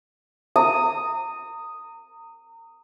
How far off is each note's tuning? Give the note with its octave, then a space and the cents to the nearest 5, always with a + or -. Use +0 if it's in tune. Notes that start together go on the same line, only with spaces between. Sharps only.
A#5 -30 D#6 +0